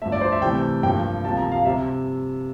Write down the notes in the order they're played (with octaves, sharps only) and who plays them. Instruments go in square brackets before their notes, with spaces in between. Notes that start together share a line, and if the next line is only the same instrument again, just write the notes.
[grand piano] G2 F3 A3 E5
D5
C5
E5
C3 E3 A3 G5
G2 F3 A#3 G5
C3 F3 A#3 A5
A#5
F5
C3 G3 E5